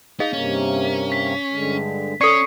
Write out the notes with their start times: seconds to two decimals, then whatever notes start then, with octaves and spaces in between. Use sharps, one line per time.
0.20 D#4 G#4 D#5 F5
0.33 G2 C3 A#3 C#4
1.12 B6
1.53 G2 D3 G#3
2.21 C#4 A4 D5 C#6 C7 C#7